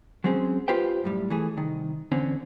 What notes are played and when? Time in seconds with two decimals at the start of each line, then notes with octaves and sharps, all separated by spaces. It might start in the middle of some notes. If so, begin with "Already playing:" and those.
0.24 F#3 G#3 C4 C#4 G#4
0.68 F4 G4 B4 C5 G5
1.04 F#2 A2 G3
1.30 E3 A3 G#4
1.57 C2 D#3
2.12 E2 D3 C4 C#4